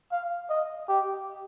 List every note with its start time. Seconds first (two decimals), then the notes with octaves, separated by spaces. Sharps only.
0.12 F5
0.49 D#5
0.88 G4